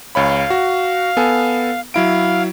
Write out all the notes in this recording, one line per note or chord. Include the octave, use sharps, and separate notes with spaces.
C#2 C#5 F5 B5
F#4
B3 A4 G#5
F#3 E4 F5 D7